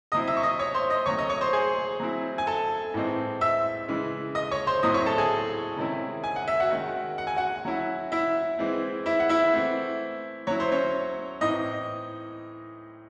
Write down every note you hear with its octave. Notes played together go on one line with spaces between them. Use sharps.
C3 F#3 C4 E4 D#5 D#6
E5 E6
C#6
D#5 D#6
C#5 C#6
C5 C6
D#5 D#6
C3 F#3 A3 D#4 C#5 C#6
D#5 D#6
C#5 C#6
C5 C6
G#4 G#5
F#3 C4 E4
G#5
A4 A5
A2 E3 G#3 C4 D#4
E5 E6
C#3 E3 G#3
D#5 D#6
C#5 C#6
C5 C6
A2 F#3 C4 E4 D#5 D#6
C#5 C#6
A4 A5
G#4 G#5
C3 D#3 G#3 C#4 E4
G#5
F#5
E5
F#4 F#5
D#3 G#3 C#4
F#5
G#5
F#4 F#5
F#3 C#4 E4
E4 E5
E3 G#3 C4
E4 E5
F#5
E4 E5
E3 A3 C4
F#3 C#4 E4 C#5
C5
C#4 C#5
A2 E3 C4 D#4 D#5